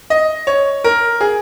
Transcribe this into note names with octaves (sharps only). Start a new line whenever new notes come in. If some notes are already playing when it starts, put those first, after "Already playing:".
D#5
C#5
A#4
G#4